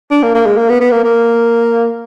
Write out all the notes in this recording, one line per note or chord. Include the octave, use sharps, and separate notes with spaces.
D4
A#3
A#3
G#3
A#3
B3
B3
A#3
A#3